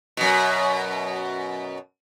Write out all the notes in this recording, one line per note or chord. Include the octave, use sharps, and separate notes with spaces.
F#2 B2